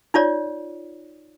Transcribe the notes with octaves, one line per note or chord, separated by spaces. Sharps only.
D#4 F4 C#5 D5